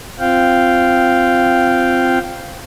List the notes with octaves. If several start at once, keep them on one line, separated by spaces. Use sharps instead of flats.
C4 F4 F5 G5